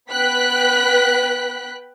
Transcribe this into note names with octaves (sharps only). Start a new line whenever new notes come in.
B3 B4 G5 F#6 B6